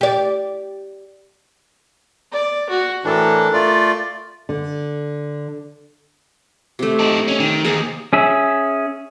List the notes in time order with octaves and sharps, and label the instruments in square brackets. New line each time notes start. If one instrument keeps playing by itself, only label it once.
[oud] G4 D5
[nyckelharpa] D5
F#4
[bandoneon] A2 E3 D4 [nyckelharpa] A4 A#4
[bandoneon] A3 F4 D5
[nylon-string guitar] D3
[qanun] C3 A3
[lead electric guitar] D#4 A4
C#4
D#3
[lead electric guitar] D#2 [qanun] G#4 A#4 C5
[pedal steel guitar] C#4 G#4 E5